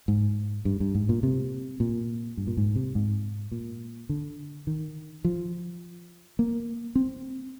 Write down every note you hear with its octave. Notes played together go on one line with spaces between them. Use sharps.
G#2
G2
G2
G#2
A#2
C3
A#2
G2
A#2
G#2
C3
G#2
A#2
D3
D#3
F3
A#3
C4